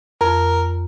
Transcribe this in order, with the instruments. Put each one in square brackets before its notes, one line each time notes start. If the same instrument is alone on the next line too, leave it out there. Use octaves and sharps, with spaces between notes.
[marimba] F2 [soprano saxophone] A#4